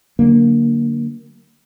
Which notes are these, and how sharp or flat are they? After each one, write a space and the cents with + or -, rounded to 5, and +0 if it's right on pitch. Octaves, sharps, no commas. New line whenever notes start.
D3 +0 F#3 +0 A#3 +0